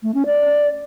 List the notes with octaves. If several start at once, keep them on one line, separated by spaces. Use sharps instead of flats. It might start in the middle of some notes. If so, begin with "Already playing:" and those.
A3
C#4
D5